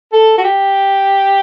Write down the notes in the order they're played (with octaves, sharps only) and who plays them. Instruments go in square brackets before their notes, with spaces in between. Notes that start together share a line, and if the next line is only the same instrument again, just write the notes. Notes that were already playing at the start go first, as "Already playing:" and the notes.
[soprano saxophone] A4
F#4
G4